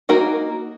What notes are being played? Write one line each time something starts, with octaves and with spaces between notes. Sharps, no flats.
A#3 D#4 F#4 A#4